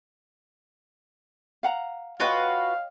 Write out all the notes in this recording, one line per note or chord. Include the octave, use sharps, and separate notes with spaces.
F5 F#5 A#5
F4 F#4 B4 C#5 D#5 F5 G5